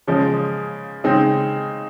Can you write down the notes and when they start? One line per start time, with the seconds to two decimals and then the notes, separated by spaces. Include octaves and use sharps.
0.07 C#3 F3 G#3 C#4
1.04 C#3 G#3 C4 D#4